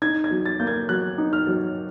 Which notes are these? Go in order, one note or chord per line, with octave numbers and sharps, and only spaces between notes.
D#4 G#6
G#6
F#3
A6
A#3 G6
G#6
F#3 F#6
D#4
F6
F#3